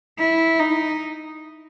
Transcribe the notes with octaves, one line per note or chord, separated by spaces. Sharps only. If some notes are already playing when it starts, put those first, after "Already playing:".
E4
D#4